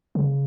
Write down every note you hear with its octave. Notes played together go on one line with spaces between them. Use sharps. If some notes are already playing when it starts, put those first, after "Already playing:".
C#3